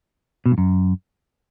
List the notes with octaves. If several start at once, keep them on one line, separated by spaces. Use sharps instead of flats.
B2
G2
F#2